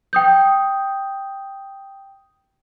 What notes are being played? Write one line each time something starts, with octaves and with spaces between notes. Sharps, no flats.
G5 D#6 G6